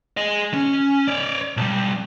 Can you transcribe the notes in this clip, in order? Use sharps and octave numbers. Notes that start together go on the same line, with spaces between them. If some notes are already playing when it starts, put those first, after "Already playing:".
G#4 D#5
C#4
C#5 D5
B1 G3